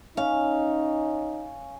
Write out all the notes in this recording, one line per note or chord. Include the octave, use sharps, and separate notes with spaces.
C#4 D#4 F5